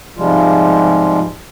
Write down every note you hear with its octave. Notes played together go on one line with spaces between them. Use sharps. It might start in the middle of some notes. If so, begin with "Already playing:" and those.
G#2 C3 F3 G3 G#3 F4